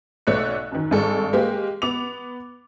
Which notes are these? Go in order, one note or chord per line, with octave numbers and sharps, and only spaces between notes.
B1 A3 C#5 D5 F#6 C#7
F#2 D#3
G#1 G2 G#3 G#4 A4 D5
G#3 A#3 G4
B3 D6 F7